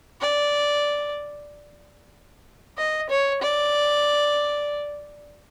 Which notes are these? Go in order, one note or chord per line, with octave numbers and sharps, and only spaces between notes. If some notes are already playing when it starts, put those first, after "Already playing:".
D5
D#5
C#5
D5